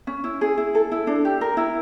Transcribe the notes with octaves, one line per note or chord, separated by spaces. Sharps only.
C#4
E4
G#4
E4
A4
E4
D4
G4
A#4
E4